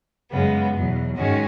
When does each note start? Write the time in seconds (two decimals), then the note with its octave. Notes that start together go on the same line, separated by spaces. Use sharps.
0.30 F#2 C#3 G#3 B3
0.73 E2 B2 F#3
1.16 G#2 D#3 G#3 C#4 F#4